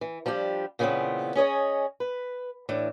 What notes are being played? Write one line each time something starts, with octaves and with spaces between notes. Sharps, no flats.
E3
F3 G3 D4 G4
A#2 C#3 E3 A3 B3 C4
C#4 G#4 C#5 D#5
B4
A2 E3 D4